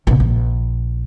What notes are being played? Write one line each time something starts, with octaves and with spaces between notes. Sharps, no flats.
A#1 C3
A#1